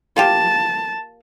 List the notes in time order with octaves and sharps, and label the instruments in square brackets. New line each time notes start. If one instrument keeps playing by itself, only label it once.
[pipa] A#3 F4 G4 [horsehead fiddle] A5